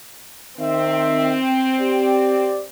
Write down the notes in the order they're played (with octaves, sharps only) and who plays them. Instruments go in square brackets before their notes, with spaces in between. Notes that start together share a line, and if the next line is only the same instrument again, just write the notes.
[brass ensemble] D#3 E5 [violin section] C4
[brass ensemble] G4 D5